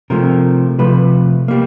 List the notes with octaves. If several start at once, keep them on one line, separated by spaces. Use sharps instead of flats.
C3 F3 A3 A#4
C3 F3 A3 B4
G3 A#3